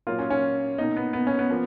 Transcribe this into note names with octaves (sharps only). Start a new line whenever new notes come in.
A#2 F#3 A#3 F4
C#4
C#4
B2 A#3 D#4
B3
B3
C#4
B3
F3 A#3